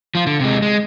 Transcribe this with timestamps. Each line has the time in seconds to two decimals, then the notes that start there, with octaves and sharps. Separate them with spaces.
0.15 F3 F4
0.27 D3
0.40 C3 G#3
0.62 G#3